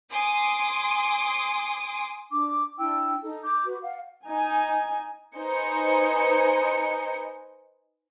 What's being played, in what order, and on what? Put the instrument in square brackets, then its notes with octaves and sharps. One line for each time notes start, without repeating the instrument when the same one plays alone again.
[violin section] G#5 C6 D6 D#6
[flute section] D4 D6
D4 E4 G5 E6
D#4 A4
D6 G6
F#4 B4
F5 F#5
[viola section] D#4 G#5
[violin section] D#4 B4 C5 D#5 G#5 C#7